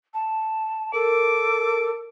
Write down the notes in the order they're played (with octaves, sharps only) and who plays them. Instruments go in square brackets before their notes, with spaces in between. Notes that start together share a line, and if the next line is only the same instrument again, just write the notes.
[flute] A5
[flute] A4 [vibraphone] A#4 [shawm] D6